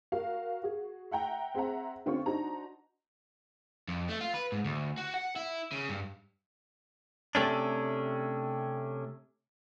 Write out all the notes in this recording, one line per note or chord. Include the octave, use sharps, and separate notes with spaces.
F#4 A#4 F5
F#4 G#4
E5 F#5 G5 A#5
C4 G#4 C5 E5 F#5 A#5
D3 C4 C#4 F4 C#6
D4 D#4 F#4 C5 A#5
F2
A3
F4
B4
G#2
D2
F#4
F#5
E4
C#3
G2
C3 A3 C#4 D4